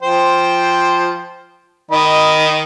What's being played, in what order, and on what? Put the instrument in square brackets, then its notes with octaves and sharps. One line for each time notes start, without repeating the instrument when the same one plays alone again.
[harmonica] F3 C5 G5
D#3 D#5 B5